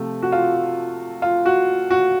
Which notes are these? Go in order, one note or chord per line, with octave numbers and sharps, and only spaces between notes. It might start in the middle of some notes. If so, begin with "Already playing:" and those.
Already playing: C3 F3 A3
F#4
F4
F4
F#4
F#4